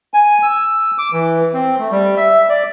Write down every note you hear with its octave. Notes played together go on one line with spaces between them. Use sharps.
G#5
E6
D6
E3
C4
A3
G3
E5
D5